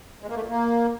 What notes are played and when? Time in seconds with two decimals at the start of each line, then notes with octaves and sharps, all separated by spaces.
0.23 G#3
0.29 A#3
0.36 A3
0.42 A#2
0.49 A#3